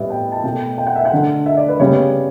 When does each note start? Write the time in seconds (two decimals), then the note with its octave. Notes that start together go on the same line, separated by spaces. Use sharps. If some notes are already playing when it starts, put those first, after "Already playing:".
Already playing: A2 G3 B3 E5
0.10 G5
0.32 A5
0.44 B2 A3 G5
0.78 G5
0.87 F#5
0.96 E5
1.05 F#5
1.12 D3 A3
1.46 E5
1.57 D5
1.69 B4
1.80 C#3 G3 B3 C#5